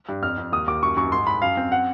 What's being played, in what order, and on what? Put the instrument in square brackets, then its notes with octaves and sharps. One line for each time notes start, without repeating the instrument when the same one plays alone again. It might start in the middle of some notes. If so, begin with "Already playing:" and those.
[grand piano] G2
F2 F6
F2
D#2 D#6
D#2 D6
F#2 C#6
F#2 C#6
G#2 C6
G#2 B5
F#2 F5
C4
F#5